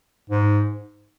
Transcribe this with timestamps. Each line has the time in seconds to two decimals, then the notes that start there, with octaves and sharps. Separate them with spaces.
0.30 G#2